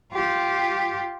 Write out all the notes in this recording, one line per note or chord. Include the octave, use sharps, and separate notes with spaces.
F4 G4